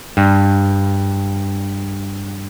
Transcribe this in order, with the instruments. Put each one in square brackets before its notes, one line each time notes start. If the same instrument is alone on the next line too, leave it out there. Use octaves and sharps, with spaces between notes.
[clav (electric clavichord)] G2